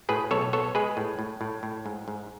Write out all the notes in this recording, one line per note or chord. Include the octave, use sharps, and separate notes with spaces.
A2 G#4 B4
B1 A4 C#5
B3 A4 C#5
G#3 G#4 B4
A2
A2
A2
A2
G#2
G#2